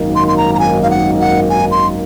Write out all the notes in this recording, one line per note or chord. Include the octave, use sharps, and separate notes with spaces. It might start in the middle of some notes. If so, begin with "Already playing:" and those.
Already playing: G#1 F#2 D#3 A#3 D#4
C6
C6
A#5
A#5
G#5
F5
F#5
F#5
G#5
C6